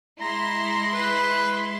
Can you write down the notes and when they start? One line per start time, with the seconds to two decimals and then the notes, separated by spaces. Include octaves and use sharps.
0.21 G#3 E4 A#5 C6
0.94 B4